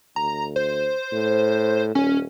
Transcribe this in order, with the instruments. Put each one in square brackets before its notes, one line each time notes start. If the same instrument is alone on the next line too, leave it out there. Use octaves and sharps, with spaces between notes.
[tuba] D2 [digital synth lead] A#5
[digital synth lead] C5
[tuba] A2
[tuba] D#1 [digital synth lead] C#4